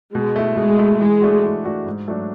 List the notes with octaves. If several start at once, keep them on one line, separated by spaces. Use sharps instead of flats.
B2 G#3
A3 E4
B2 G#3
A3 E4
E3 G#3
A3 D4 F#4
E3
A3 D4 F#4
G#2
F#3 A3 D4 F#4